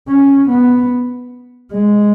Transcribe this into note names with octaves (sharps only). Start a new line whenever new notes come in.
C#4
B3
G#3